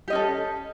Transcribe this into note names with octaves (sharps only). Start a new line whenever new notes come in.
C#4 G4 A4 D#5